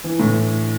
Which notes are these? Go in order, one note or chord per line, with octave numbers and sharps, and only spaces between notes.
E3
A2